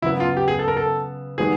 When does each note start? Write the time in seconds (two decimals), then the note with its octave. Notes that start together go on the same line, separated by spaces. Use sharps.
0.02 C#3 F#3 B3 E4
0.20 F4
0.37 G4
0.48 G#4
0.59 A4
0.68 A#4
0.77 A4
1.38 D#3 G3 B3 D#4 G#4